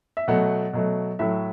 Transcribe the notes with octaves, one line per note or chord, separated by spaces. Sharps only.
E5
B2 F#3 A3 F#5
B2 F#3 A3
A2 F#3 A3 E5